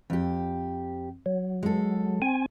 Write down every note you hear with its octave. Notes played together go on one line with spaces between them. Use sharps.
F2 G4
F#3
G#3 A4
C4 G#5